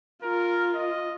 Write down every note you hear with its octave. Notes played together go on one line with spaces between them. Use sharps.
F4 A#4
D#5